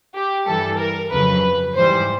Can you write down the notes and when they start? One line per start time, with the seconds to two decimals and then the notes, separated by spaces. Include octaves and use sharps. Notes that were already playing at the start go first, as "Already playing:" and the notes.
0.15 G4
0.47 G2 E3 G3 A4
0.79 A#4
1.11 F2 C#3 F#3 B4
1.75 G#2 E3 G3 C5